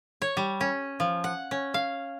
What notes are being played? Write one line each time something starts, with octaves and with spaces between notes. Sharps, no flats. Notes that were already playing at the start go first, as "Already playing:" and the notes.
C#5
G3
C#4
F3
F#5
C#4
F5